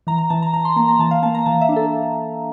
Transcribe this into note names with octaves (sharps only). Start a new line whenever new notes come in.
E3 A#5
A#5
E3 A5
A#5
E3 A#5
C6
A#3 A#5
A#5
E3 A5
F5
A#3 A5
A#5
E3 A5
E5
D4
A4